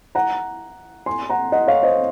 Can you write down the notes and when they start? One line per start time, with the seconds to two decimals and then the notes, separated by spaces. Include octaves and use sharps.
0.15 F#5 A#5
1.06 G#5 C6
1.29 F#5 A#5
1.52 D#5 F#5
1.67 C#5 F5
1.83 C5 D#5